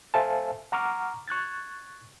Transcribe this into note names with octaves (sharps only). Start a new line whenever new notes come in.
A4 C5 E5 F5 G#5 A5
F#5 A#5 C#6 D6 F6
C#6 F#6 G#6 A6